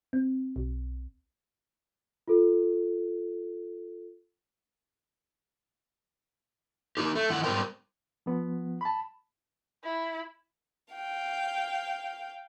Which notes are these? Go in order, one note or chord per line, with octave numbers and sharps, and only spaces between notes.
C4
B1
F4 A4
A#3 D#4 G4
A3
D#3 E4 F#5
G#2 G3 B3 A#4 C5 G5
F3 B3
A5 B5
E4
F5 G5